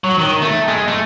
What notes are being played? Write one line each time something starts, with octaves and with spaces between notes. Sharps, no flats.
F#3
D#3
A3
G#3
A3